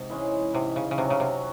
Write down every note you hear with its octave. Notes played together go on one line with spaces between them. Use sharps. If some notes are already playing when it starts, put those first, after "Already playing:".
Already playing: G#2 C3
E3 G#3 C#4
G#2 C3
C#3
C#3
C3 F#3 C#4 F#4
C#3
C3